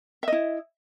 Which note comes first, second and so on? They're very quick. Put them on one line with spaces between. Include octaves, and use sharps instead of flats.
E5 D#5 E4